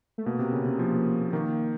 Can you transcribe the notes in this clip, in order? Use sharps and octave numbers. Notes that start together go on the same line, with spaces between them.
A3
B2 A#3
C3
C#3
C3
F3
D#3 A#3